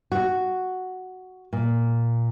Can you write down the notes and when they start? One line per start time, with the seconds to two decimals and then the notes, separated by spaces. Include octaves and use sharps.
0.12 F#4
1.53 A#2